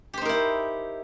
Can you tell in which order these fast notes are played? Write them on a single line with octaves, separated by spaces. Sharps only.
G4 C5 D#4 A#4 E4